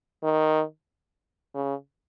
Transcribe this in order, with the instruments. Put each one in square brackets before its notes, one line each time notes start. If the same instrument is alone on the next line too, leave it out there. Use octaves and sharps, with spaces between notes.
[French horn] D#3
C#3